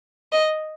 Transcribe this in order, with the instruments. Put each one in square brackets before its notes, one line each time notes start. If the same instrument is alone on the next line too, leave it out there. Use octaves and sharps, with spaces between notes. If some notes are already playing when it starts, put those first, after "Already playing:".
[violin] D#5